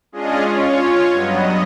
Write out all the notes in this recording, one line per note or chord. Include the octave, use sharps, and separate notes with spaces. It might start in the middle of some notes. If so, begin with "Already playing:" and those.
G#3 C#4 D4 F4 G#4 D#5
C#4 F4 C#5
G2 F#3 B3 D#5